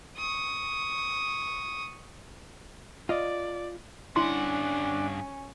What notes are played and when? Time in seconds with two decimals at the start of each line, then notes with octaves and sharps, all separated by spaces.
0.17 C#6 D#6
3.09 F4 D5 D#5
4.16 G2 C#4 D4 E4 F#5 C6